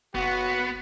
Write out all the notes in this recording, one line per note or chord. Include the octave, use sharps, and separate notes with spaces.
F#1 B3 F#4